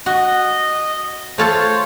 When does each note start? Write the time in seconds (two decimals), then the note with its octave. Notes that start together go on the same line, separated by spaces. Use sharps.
0.06 F#4 D#5
1.38 A3 F4 A4 C5 C#5